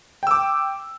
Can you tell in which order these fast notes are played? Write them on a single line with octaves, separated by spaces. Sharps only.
G5 E6 D6